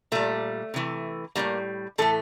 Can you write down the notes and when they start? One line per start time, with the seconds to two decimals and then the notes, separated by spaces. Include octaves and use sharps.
0.12 A#2 G3 A3
0.74 C3 E3 A3
1.35 A2 E3 G3 A#3
1.98 A2 E3 A3 A4